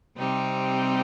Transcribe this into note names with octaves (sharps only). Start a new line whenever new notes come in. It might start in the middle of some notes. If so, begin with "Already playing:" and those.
C3 G3 C4 D#4 G4